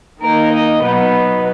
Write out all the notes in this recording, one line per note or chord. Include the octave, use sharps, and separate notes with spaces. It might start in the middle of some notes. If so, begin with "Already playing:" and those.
D#3 A#3 D#4 A#4
D#5
B2 F#3 B3 D#4 B4